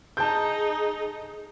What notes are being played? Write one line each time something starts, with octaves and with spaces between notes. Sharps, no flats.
D#4 G#4 A5 G6